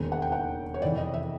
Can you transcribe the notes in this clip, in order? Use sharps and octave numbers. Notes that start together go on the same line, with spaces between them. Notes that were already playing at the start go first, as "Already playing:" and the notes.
Already playing: E1 D#2 C#3
F#5
G5
F#5
C#5
F2 C3 E3 D5
D#5
E5